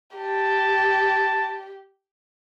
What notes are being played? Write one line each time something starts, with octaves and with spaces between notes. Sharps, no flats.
G4 A5